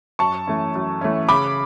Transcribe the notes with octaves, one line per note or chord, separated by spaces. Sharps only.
F#2 A5 C#6
E3 A3 C#4
F#2
E3 A3 C#4
C#3 B5 D6